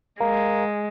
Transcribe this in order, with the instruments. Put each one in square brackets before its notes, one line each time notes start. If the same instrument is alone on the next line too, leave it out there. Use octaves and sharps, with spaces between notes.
[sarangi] G#3 [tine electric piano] A#4 F5 A#5